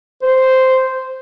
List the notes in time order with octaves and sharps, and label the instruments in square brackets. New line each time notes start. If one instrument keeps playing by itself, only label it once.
[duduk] C5